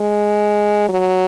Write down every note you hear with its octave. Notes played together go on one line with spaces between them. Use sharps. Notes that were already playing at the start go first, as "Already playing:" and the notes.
Already playing: G#3
F#3